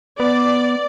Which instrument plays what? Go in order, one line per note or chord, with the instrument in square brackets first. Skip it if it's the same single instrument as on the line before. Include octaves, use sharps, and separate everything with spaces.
[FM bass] B3 [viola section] D5